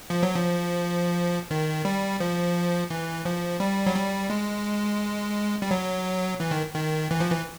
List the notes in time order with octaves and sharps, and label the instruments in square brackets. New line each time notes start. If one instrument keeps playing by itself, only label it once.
[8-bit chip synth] F3
F#3
F3
D#3
G3
F3
E3
F3
G3
F#3
G3
G#3
G3
F#3
E3
D#3
D#3
E3
F3
E3